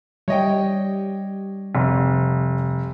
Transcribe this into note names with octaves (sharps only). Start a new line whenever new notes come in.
G3 C#5 D#5 G5
F1